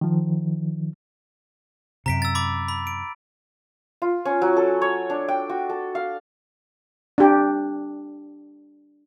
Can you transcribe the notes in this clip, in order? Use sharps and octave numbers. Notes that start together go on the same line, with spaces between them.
D#3 F3
F#2 C3 A#5 B6 D7
E6 A6
B5 D6 A6
B5
D7
F4
C#4
F#3
A4
C#5
D4
G5
F#4
A4
F5
D4 G4